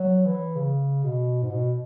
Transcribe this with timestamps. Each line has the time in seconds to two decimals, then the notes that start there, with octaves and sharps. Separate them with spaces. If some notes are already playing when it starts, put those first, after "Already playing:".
Already playing: F#3
0.25 E3
0.56 C#3
1.04 B2
1.43 G#2
1.51 B2